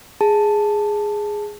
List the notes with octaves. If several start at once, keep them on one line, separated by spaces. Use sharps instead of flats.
G#4 A5